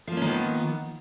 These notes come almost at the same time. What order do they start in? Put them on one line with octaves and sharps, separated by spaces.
F3 A#3 C#4 D#3 B3